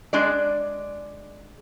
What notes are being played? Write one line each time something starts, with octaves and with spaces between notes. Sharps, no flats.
G#3 D4 D5